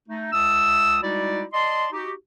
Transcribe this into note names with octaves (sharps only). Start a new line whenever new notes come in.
A3 D#4
C#2 E5 A5 D#6 E6
G3 G#3 D#4 E4 F#4 D5
D5 D#5 A5 C6
D#4 F#4 G4